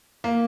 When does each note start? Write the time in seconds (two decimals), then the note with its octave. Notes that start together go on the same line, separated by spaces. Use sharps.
0.24 A#3